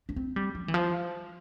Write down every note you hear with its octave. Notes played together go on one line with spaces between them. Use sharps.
D4
C4
G3
F3
E3
F3